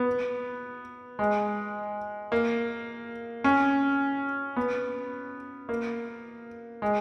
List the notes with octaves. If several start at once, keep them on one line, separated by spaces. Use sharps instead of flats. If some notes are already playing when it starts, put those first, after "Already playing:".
Already playing: B3
G#3
A#3
C#4
B3
A#3
G#3